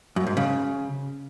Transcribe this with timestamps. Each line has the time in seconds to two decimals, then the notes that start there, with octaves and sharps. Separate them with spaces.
0.16 F#2
0.27 G#2
0.37 C#3